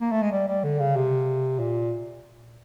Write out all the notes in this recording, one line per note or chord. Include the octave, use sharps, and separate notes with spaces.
A#3
A3
G#3
G3
G3
D3
C#3
C3
A#2